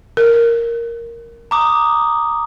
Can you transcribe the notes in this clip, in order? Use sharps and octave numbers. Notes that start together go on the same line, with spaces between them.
A#4
A#5 D6 D#6